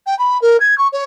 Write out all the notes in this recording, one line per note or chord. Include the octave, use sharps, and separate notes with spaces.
G5
B5
A#4
G#6
C#6
C#5